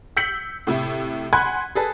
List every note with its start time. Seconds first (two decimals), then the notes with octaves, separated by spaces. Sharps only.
0.17 E6 G6 B6 C#7 F#7
0.67 A2 C3 E4
1.33 F#5 G#5 B5 C6 F#6 G#6
1.75 G#4 A4 B4